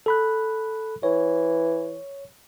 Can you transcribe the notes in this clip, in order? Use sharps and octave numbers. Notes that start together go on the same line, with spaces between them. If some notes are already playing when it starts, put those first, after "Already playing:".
A4 B5 F#6
E3 C#5